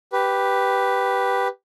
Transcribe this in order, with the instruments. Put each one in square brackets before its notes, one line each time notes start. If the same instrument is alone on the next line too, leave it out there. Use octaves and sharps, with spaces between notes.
[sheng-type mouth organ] G4 B4